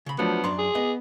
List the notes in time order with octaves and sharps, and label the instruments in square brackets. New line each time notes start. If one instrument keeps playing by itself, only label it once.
[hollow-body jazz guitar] C#3 B5
[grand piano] F3 F#3 D4 [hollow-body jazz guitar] A3 [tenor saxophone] B3
[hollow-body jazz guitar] F#2 D4 A#5 [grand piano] C6
[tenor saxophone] G#4
[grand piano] B3 [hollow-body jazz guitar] D#5